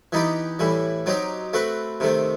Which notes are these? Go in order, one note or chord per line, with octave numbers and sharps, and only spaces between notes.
E3 B3 D#4 G4
A2 E3 G3
F#3 C4 D#4 G4
A3 C4 F#4 B4
C3 D#3 A3 C4